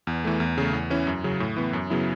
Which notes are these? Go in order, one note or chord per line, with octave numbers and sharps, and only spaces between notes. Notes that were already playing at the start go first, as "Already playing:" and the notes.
E2
E3 A3
E2
C#3 A3
E2
E3 C#4 E4
F#2
C#3 F#3
A2
E3 B3
F#2
C#3 F#3 B3 E4